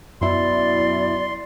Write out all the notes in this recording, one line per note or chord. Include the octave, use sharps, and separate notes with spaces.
F#2 B2 E4 D5 C6